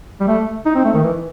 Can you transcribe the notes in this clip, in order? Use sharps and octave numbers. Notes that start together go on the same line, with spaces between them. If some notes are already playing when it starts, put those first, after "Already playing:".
G3
A3
D#4
C4
A3
D#3
E3